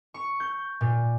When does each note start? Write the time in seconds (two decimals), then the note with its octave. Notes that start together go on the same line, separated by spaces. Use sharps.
0.14 C#6
0.40 G6
0.81 A#2